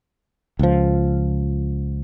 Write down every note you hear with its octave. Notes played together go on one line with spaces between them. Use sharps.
C#2 F3